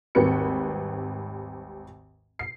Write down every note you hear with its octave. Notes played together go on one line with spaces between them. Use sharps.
G#1 D#2 G3 C4 B4 C#7
C7